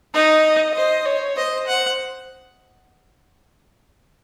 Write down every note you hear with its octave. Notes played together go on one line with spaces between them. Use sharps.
D#4 D#5
C5 D#5
C#5
C5 D#5
F#5